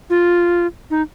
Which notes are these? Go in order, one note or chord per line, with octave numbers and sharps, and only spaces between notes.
F4
D#4